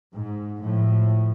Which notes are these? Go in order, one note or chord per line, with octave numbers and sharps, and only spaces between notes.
G#2
A2 F3